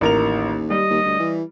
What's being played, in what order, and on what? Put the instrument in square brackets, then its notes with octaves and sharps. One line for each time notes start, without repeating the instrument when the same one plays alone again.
[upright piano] A1 A#4 F7 [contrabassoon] D#2
[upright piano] G3 [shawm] D#5
[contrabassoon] D#2
D2
E3